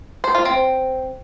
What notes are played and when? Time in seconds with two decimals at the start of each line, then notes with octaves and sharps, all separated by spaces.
0.24 C5
0.35 F4
0.45 C4